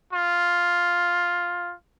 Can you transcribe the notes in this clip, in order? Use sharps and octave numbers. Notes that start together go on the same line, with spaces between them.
F4